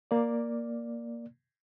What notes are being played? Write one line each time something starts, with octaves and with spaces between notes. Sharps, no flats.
A#3 D5